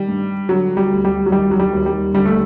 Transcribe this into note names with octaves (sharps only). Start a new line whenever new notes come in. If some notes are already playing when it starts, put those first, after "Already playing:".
Already playing: D#3 G3
G2
D3 F#3
G3
D2
G3
F#3
D#3 G3
F#3
G3
D#2
G3
D3 G3
A3